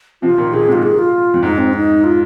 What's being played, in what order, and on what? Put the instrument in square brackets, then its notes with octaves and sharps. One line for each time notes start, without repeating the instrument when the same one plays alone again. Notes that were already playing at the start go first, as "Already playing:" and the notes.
[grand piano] C3 F3 [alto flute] F4
[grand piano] A#2 D#3
[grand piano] A#2 D#3 [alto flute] G#4
[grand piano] G#2 C3
[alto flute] F4
G#4
F4
[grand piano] F2
[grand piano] G#2 [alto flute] D#4
[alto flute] C4
D#4
F4